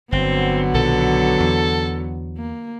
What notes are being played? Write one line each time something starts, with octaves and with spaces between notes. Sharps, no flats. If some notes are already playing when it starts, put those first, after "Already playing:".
G1 D3 F#3 B3 C4
B1 A#2 D#3 A4
E2
A#3